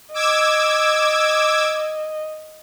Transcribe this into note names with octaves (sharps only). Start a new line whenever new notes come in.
D#5 D6 E6 G#6